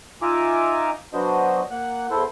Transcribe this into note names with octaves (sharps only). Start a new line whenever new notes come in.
D#4 F4 E5 G#5 A#5 D6
F#3 B3 D4 F#4 C5 D#5
A#3 F#5 F#6
E2 E4 A4 C5 C6